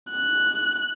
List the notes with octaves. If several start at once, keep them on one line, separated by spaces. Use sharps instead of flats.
F#6